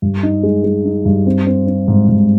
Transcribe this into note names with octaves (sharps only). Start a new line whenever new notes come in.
G2
D#4
G#3
G#3
D#4
G2
C4
C4
C4
G#2
G#2